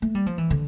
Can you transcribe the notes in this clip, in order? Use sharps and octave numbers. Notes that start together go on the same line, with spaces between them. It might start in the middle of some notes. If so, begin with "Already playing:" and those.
A3
G3
F3
E3
D3